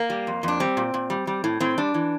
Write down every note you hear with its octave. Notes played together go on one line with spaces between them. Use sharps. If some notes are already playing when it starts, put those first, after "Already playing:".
Already playing: A#3
G3
F2
F2 D4
G3 C4
A#2
A#2
G3
G3
A2
A2 C4
G3 D4
E3